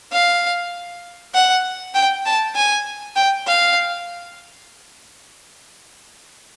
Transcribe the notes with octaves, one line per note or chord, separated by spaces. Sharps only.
F5
F#5
G5
A5
G#5
G5
F5